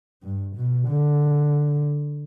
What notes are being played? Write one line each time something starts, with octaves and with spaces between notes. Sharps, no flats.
G2
B2
D3